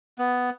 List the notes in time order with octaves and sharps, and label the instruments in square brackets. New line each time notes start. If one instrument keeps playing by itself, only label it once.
[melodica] B3